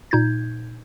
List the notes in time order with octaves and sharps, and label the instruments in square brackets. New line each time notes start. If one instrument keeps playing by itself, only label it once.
[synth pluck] A#2 D#4 G6 G#6